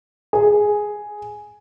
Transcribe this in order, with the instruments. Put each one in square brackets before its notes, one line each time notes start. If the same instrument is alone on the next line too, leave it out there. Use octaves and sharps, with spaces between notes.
[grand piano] G#4